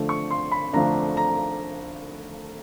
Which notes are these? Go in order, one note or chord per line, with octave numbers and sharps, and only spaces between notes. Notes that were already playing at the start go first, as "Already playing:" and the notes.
Already playing: D3 F3 A3 D4
C#6
C6
B5
D3 F3 A3 D4 A#5
A#5